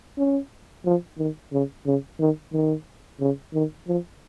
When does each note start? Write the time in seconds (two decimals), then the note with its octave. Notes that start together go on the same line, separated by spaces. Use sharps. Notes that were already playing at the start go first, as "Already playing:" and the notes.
0.18 C#4
0.85 F3
1.18 D#3
1.52 C#3
1.86 C#3
2.20 D#3
2.53 D#3
3.20 C#3
3.54 D#3
3.87 F3